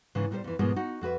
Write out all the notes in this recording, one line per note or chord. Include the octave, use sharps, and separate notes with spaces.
G#2 C#3 E3
A#2 G3 G4 B4 C5
F2 E3
G#2 B2 F3 G#3 A#3 B3
D#4 F#4
F2 F#4 B4 E5